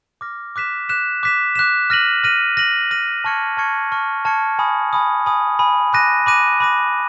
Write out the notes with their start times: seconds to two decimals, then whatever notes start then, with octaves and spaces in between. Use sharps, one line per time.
0.21 D6 F6 A#6
0.56 D6 F#6 B6 E7
0.89 D6 F#6 B6 E7
1.23 D6 F#6 B6 E7
1.55 D6 F#6 B6 E7
1.90 F6 A#6 D#7 F#7
2.24 F6 A#6 D#7 F#7
2.57 F6 A#6 D#7 F#7
2.91 F6 A#6 D#7 F#7
3.24 A5 C#6 F6 G#6 C#7
3.57 A5 C#6 F6 G#6 C#7
3.91 A5 C#6 F6 G#6 C#7
4.25 A5 C#6 F6 G#6 C#7
4.59 G#5 B5 D#6
4.93 G#5 B5 D#6
5.26 G#5 B5 D#6
5.59 G#5 B5 D#6
5.93 B5 D6 F#6 A#6 D#7
6.26 B5 D6 F#6 A#6 D#7
6.60 B5 D6 F#6 A#6 D#7